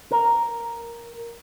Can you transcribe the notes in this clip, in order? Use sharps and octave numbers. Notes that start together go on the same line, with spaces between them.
A#4